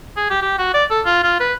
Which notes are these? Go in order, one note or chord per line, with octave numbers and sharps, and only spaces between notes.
G#4
G4
G4
F#4
D5
A4
F4
F4
B4